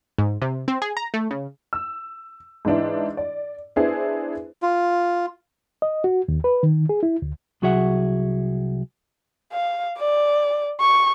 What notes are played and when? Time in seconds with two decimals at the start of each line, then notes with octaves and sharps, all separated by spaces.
0.18 G#2
0.42 C3
0.68 C4
0.82 G#4
0.97 A#5
1.14 A3
1.31 C#3
1.73 E6
2.65 G#2 E3 D4 E4
3.17 D5
3.76 B3 D4 E4 G#4 C5
4.62 F4
5.82 D#5
6.04 F#4
6.28 D#2
6.44 B4
6.63 D#3
6.89 G#4
7.03 E4
7.22 D2
7.62 C2 F#3 F#4 G#4 E5 F#5
9.52 F5
9.98 D5
10.80 C#6